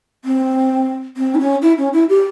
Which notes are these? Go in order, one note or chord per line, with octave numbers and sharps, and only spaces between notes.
C4
C4
E4
C#4
E4
C#4
E4
G4